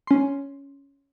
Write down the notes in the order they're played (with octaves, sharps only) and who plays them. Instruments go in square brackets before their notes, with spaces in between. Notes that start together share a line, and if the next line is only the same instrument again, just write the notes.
[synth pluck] C#4 C6